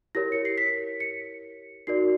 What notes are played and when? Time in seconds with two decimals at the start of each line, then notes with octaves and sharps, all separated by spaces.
0.15 E4 G4 A#4 C#5 A#6
0.32 C#7
0.45 C7
0.58 B6
1.00 C#7
1.87 D#4 F#4 A#4 D5 C7